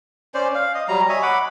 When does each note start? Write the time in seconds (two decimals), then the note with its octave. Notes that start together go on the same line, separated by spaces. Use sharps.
0.34 C#4 C5 D5
0.55 F5
0.75 D#5
0.88 F#3 G3 A#5
1.09 C#5 D#5 E5 G#5
1.22 F#5 B5 D6